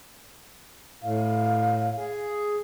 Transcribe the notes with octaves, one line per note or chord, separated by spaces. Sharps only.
A2 F5
G#4